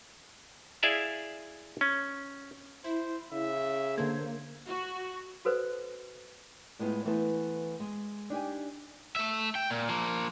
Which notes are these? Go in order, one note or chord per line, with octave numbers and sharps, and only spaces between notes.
E4 G#4 D5 E5 F5
C#4
E4 C5
C#3 E5
D3 A#3 A4 C5 G#6
F#4
F#4 A4 B4 C5 D5
A2 G#3 A3 B3 F4
E3 A3 B3 A4 C5
G#3
D4 D#4 G4 G#5
A3 E5
G5
A#2
F3 A#3